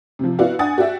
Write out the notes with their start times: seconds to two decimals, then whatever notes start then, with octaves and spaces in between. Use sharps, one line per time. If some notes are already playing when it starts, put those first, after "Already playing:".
0.19 C3 F3
0.39 B3 E4 F#4 D5 F5
0.59 D4 F#5 G#5 D#6 A6
0.78 F#4 G4 D5 E5